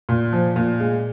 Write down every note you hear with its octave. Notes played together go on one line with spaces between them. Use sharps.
A#2
F3
A#2
G#3